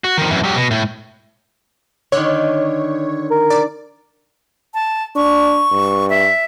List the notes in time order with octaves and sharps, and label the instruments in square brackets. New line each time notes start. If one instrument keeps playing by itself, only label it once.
[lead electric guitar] F#4
D#3 F3
F#2 E3
F#3 G4
B2
A2
[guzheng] D3 D#3 [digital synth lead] C#5
[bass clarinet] A#4
[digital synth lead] D5
[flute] A5
[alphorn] D4 [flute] C#6
[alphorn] G2
[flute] E5